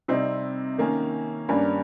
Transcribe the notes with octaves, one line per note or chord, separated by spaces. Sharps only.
C3 G3 C4 D#4
D#3 A#3 C#4
G2 G3 A#3 C#4